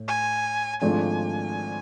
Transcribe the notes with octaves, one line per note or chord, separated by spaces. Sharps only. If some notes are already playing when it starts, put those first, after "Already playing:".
Already playing: A2
G#5
G#1 G#2 F3 A3 D4 G#5